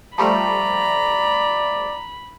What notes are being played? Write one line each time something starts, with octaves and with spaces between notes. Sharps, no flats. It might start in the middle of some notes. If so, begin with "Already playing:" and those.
F3 G3 A3 D5 A#5 B5